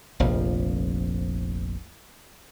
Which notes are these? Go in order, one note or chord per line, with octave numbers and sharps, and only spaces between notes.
F1 A#1 F2 F3